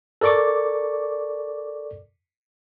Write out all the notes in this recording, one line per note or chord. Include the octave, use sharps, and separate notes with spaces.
A4 A#4 D5 C#6 D6